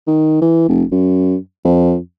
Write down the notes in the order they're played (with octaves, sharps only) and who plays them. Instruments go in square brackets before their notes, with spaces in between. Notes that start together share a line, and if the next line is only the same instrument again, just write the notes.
[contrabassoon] D#3
E3
F1
F#2
F2